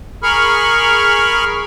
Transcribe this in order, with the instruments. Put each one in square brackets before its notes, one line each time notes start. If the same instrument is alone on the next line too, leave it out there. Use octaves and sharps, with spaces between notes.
[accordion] G#4 A#4 B5 C#6 F6